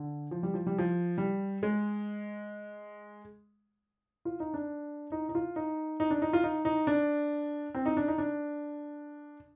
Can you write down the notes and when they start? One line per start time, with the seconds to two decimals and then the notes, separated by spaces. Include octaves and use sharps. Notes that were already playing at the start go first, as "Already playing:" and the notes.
Already playing: D3
0.31 F3
0.43 G3
0.54 F3
0.67 G3
0.78 F3
1.18 G3
1.63 G#3
4.25 F4
4.40 D#4
4.54 D4
5.12 D#4
5.29 D#4
5.35 F4
5.56 D#4
6.00 D#4
6.10 D4
6.22 D#4
6.33 F4
6.44 D#4
6.65 D#4
6.87 D4
7.75 C4
7.86 D#4
7.97 D4
8.08 D#4
8.18 D4